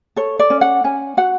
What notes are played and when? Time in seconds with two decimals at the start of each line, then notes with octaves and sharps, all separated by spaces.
0.16 A4 C#5
0.39 D5
0.50 C#4
0.61 F#5
0.84 C#4 G#5
1.17 F#4 F#5